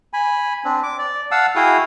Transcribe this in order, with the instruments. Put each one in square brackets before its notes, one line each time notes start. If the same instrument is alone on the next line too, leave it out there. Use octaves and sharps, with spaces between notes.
[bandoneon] G#5 B5
C4 D4
D6
D5
F5 F#5 A5 E6
E4 F#4 G#4 F5 G5 D#6